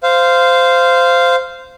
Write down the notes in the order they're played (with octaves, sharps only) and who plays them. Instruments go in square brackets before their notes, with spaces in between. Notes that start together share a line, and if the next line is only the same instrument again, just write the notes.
[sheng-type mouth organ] C5 F5